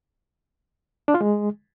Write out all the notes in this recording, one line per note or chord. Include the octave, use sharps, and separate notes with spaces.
D4
F4
G#3